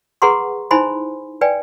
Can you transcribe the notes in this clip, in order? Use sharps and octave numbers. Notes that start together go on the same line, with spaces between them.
G#4 B4 F#5 A#5 C6 C#6
D#4 E4 C5 G#5 B5 C6
B4 D5 G5 G#5